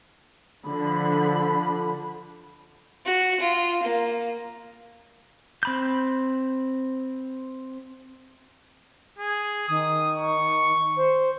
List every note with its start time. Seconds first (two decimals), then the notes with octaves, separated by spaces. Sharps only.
0.67 D3 F3 B5
3.06 F#4
3.40 F4
3.82 A#3
5.63 C4 B5 G6
9.19 G#4
9.68 D#3 D#6
10.16 C#6
10.97 C5